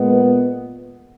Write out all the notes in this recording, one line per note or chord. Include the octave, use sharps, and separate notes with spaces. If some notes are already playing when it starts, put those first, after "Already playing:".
Already playing: A#2 G#3 B3